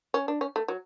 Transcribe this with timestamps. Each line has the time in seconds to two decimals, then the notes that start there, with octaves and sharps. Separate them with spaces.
0.14 C#4
0.28 D4
0.41 C#4
0.56 A3
0.68 F#3